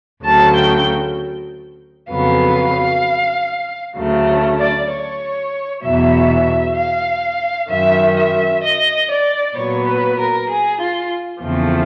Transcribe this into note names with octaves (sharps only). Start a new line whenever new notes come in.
D2 C#3 F#3 A5
G5
F2 C#3 F#3 B3 F5
D2 C#3 F#3 A3
D5
C#5
E2 B2 F#3 E5
F5
F#2 D#3 F#3 E5
E5
D#5
D5
A#2 F#3 B3 C#5
B4
A#4
G#4
F4
E2 C#3 F3 A3 C4